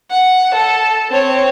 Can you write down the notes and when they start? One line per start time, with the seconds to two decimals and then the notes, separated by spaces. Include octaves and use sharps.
0.11 F#5
0.54 A4
1.11 C4 C#5